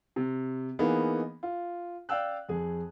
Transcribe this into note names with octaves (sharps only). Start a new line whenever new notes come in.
C3
E3 A#3 B3 D#4 G#4
F4
D5 F5 G5 E6 F#6
F2 G#4